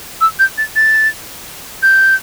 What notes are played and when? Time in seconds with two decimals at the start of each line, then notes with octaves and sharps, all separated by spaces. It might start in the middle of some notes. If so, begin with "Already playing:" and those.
0.21 E6
0.39 G6
0.58 A6
0.76 A6
1.83 G6